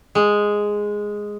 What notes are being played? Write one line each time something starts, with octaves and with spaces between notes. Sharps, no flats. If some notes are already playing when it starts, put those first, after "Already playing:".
G#3